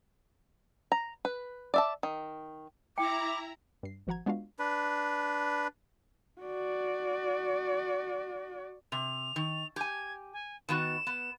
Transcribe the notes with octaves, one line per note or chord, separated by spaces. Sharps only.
A#5
B4
D5 E5 A5
D#3
E4 G5 A#5 D6
G2 C7
G#1 F3 F#4 F#5 A#5 G#6
G#3 B3 D4 F4 F#4 F5
D4 B4
F#4 D5
C3 F7
D#3
G4 G#5 G#6
G#5
D#3 B3 F#4 E7
B3